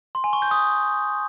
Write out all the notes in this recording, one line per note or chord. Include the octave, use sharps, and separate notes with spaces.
C6
G#5
C#6
G6
D#6